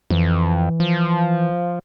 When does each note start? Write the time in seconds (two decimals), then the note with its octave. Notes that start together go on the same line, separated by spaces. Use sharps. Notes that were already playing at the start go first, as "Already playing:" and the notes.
0.10 F2 E3
0.80 F3